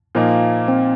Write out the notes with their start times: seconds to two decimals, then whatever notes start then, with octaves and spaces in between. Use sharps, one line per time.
0.15 A#2 F3 A#3 D#4
0.68 C4